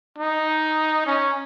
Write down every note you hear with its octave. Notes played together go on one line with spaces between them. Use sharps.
D#4
C#4